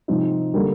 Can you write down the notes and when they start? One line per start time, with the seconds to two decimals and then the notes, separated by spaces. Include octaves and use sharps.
0.08 C3 F3 C4 D#4
0.54 D3 G3 A#3